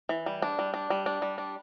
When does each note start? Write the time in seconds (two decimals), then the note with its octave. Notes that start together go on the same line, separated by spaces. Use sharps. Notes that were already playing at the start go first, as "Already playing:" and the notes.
0.09 E3
0.26 G3
0.42 D4
0.59 G3
0.74 D4
0.90 G3
1.06 D4
1.22 G3
1.38 D4